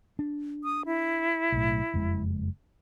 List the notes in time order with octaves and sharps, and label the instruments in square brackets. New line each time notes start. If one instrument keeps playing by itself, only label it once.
[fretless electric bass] D4
[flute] D#6
E4
[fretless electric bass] B1 A2
F#1 F2 G#3